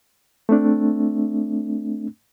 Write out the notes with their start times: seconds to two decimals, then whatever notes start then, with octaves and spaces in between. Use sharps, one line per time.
0.49 A3 C4 D4